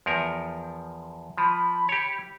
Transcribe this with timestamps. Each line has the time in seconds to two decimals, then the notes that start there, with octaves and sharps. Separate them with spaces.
0.06 E2 F3 A#4
1.38 F3 B5
1.89 G4 C#5